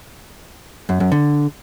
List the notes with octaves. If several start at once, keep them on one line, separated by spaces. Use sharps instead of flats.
F#2
F#2
D3